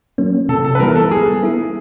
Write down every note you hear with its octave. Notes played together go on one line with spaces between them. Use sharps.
F#3 A#3 C#4
C3 A4
A4
B4
E3 G3 B3 E4 A#4
A4
G3 G#4
B3 E4 G#4